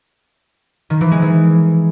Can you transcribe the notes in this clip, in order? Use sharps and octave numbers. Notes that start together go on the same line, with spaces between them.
D#3
E3
G#3
E3